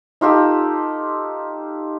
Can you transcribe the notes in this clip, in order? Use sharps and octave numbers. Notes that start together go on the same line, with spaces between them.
D#4 F4 G4 A4